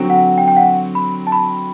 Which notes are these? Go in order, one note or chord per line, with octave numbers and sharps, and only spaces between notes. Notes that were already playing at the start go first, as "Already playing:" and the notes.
Already playing: D3 F#3 C4 F#4
F#5
G5
G5
F#5
B5
A5
B5